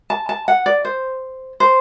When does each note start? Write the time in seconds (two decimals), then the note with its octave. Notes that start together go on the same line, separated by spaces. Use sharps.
0.10 A5
0.29 A5
0.48 F#5
0.66 D5
0.85 C5
1.60 C5